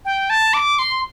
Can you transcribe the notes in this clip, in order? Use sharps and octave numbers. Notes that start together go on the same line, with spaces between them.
G5
A5
D6
C6